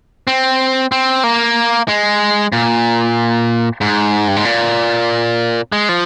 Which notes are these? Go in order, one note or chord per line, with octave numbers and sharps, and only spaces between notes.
C4
C4
A#3
G#3
A#2
G#2
G2
G#2
A#2
G#3
F3